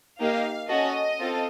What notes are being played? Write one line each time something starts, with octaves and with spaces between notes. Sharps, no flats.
A#3 D#4 G4 F5
C#4 F#4 A4 D#5
C4 F4 A4